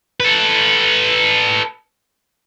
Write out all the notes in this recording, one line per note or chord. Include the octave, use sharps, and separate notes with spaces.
A4 B4